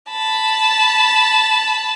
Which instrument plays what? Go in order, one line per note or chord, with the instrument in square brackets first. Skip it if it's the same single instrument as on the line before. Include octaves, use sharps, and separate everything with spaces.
[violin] A5 B5